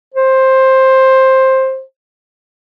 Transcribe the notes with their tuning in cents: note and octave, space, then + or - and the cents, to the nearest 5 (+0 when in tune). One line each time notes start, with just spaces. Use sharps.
C5 +10